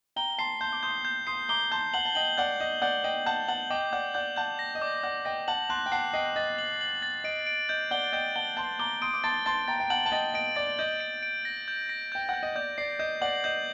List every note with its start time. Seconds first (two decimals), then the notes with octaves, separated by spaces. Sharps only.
0.16 G5 A#5 G7
0.38 A5 C6 C7
0.61 A5 C6 G6
0.72 D6
0.83 C6 D#6 G6
1.05 G6
1.27 C6 D#6 C7
1.49 A#5 D6 G7
1.71 A5 C6 G6
1.94 F#5 A5 F#7
2.05 A5
2.15 D#5 G5 F#7
2.38 D5 F#5 G6
2.60 D#5 G6
2.82 D5 F#5 G6
3.04 D#5 G5 F#7
3.26 F#5 A5 G6
3.48 F#5 A5 F#7
3.70 D#5 G5 D6
3.93 D5 F#5 G6
4.14 D5 F#5 G6
4.36 F#5 A5 G6
4.59 A#6
4.75 D#5
4.81 D5 D6
5.03 D5 F#5 G6
5.25 D#5 G5 A#6
5.48 F#5 A5 F#7
5.70 A5 C6 F#6
5.86 G5
5.92 F#5 A5 C7
6.13 D#5 G5 C7
6.36 D#5 A6
6.58 F#7
6.81 F#7
7.03 A6
7.24 D#5 D7
7.47 D7
7.69 D#5 G6
7.91 D5 F#5 G7
8.13 D#5 G5 G6
8.36 F#5 A5 G7
8.57 A5 C6 G6
8.79 A#5 D6 G7
9.02 C6 D#6 D7
9.14 D6
9.24 A5 C6 A6
9.46 A5 C6 A6
9.68 G5 A#5 A6
9.80 G5
9.90 F#5 A5 F#7
10.06 A5
10.12 D#5 G5 A6
10.34 D#5 D7
10.56 D5 A6
10.79 D#5 G6
11.00 D7
11.23 D7
11.45 A#6
11.68 G6
11.89 A#6
12.12 G5 G6
12.29 F#5 G6
12.43 D#5
12.55 D5 G6
12.78 D5 C7
12.99 D#5 G6
13.21 D5 F#5 F#7
13.44 D#5 G6